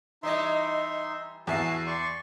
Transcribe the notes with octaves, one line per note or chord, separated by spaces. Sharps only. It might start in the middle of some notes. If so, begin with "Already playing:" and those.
E3 G3 D#4 D#5 E5 C6
E2 F#4 G#4 E5 A5 C7
D5 C6 C#6